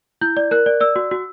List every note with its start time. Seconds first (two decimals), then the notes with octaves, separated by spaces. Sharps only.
0.21 E4 G6
0.37 D5
0.51 A#4 F#6
0.66 D5
0.81 D5 E6
0.96 F#4
1.11 F#4